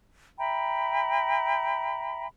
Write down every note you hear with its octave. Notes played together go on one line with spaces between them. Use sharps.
E5 G5 A#5 B5